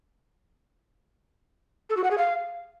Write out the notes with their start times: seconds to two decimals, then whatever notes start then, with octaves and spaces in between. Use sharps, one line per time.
1.90 A4
1.97 F#4
2.04 F#5
2.11 G#4
2.18 F5